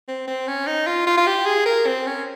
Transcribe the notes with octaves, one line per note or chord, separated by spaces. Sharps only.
C4
C4
C#4
D#4
F4
F4
F4
G4
G#4
A#4
C4
C#4